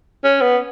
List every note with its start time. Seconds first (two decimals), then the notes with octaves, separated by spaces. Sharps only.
0.24 C#4
0.41 B3